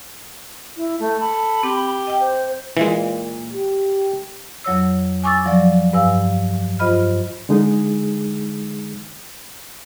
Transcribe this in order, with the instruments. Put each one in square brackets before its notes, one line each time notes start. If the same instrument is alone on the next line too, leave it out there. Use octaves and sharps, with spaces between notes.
[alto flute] E4
A3
[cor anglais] A4 [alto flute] B5
[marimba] C4 [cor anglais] G4
[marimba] D#5 G5
[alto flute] C5
[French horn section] A#2 [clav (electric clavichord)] E3 G#3
[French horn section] G4
[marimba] F2 F#3 C#5 E6
G#5 C#6 D6 E6 A6
F3 F#3 D5
G2 B4 F5 G#5 E6
G2 F4 C5 D#5 B5 F6
[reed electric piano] D3 G#3 D#4 G#4